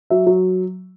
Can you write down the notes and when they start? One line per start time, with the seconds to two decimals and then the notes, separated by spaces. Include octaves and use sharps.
0.10 F#3 E5
0.26 F#3